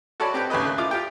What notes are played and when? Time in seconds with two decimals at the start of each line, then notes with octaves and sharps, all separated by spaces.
0.20 F#4 A4 C#5 D5 A5 B5
0.34 C4 G4 B4 G5
0.50 D#2 C#3 A3 B4 D#5
0.65 A3 F#6
0.78 E4 F4 D6
0.91 F4 G4 G5